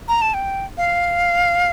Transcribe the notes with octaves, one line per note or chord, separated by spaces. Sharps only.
A#5
A5
G5
F5